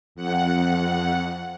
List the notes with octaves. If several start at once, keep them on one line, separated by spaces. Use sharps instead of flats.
F2 F#5